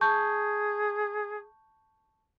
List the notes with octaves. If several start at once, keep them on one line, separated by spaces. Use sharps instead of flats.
G#4 A5 C#6 G6